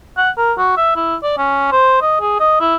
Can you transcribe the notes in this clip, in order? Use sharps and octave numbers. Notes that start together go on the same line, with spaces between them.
F#5
A#4
F#4
E5
E4
D5
C#4
C5
D#5
G#4
D#5
E4